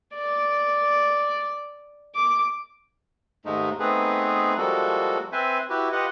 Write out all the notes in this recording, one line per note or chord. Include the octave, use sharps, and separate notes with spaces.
D5
D6
D#2 G#2 G#3 A3 D#4
A3 B3 C4 D#4 G#4 B4
F3 G3 G#3 A#3 F#4 A4
C4 B4 C5 E5 G#5
E4 F#4 G4 B4
F4 G4 B4 D#5 F#5